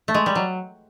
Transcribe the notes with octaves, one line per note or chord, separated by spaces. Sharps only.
A3
G#3
G3
F#3